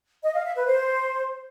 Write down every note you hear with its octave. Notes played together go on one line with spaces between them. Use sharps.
D#5
F5
E5
B4
C5